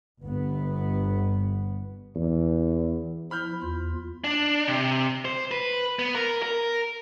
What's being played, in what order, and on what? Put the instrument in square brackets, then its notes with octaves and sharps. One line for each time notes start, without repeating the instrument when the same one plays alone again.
[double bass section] G1 B3
[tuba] E2
[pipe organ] F3 E4 [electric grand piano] B5 F6 G6
[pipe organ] E2 F4
[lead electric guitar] D4
C3
C5
B4
B3
A#4
A#4